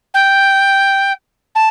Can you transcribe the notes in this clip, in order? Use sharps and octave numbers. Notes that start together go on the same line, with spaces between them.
G5
A5